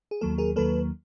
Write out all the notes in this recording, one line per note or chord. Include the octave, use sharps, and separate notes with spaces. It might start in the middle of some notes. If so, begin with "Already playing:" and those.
G#4
D#2 D#3 F#3 A#3 A4
G#4 A#4
D#2 D#3 F#3 A#3 A4 B4